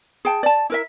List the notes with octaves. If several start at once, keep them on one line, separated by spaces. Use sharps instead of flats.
G#4 G5 A5
D5 A5
E4 A#4 E5